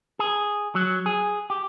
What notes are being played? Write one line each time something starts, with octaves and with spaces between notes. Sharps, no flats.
G#4
F#3
G#4
G4